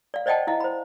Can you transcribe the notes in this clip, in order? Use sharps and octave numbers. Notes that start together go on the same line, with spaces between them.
D5 F5
C5 D5 D#5 F#5 G5 A5
E4 D#5 F5
C5 B5